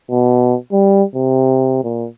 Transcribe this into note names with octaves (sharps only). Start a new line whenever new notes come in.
B2
G3
C3
A#2